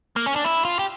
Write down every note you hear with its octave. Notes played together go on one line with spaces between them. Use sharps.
A#3
C#4
D4
E4
F4
G4